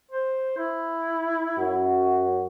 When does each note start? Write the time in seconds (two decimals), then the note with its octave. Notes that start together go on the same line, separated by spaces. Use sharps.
0.11 C5
0.58 E4
1.58 F#2 F#4